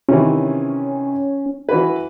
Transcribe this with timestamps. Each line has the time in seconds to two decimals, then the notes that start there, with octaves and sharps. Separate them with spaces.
0.09 C3 D#3 E3 C#4
1.69 E3 F#4 B4